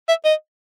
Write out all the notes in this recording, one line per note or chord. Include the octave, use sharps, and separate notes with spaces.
E5
D#5